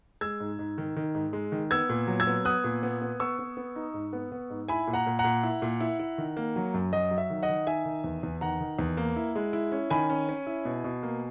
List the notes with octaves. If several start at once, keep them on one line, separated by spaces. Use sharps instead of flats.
G#3 E6 G#6
G#2
G#2
D#3
D#3
G#2
G#3
D#3
B3 E6 G#6
A#2
F#3
E6 G#6
B3
B3 D#6 F#6
A#2
B3
B3
B3 C#6 E6
B3
B3
D#4
G#2
B3
B3
G#2
E4 G#5 B5
A#2
F#5 A#5
A#2
F#5 A#5
A#2
E4
A#2
E4
E4
D#3
A#3
F#3
F#2
F#3 D#5
F#3
E5
D#3
D#5 F#5
D#3
D#4 E5 G#5
D#3
E2
E2
D#3 F#5 A#5
D#3
E2
A#3
E4
G#3
E4
C#4
D#3 G#5 B5
C#4
C#4
E4
B2
B2
A#3